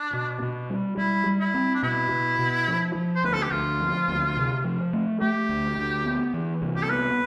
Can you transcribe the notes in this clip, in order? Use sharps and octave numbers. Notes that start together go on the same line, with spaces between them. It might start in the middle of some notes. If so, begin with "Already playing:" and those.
Already playing: D4
B2
B2
G3
G3 E4
G3
E4
C4
D4
B2 E4
B2
B2
F3
F3
C5
D2 B4
A4
G4
D2 F4
F3
D2
C3
F3
A3
A3 G4
D2
D2
B3
E3
C2
G4
A4
B3 B4